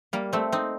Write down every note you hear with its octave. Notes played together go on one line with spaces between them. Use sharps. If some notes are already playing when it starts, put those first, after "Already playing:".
G3 A#3
A3 C4
C4 D#4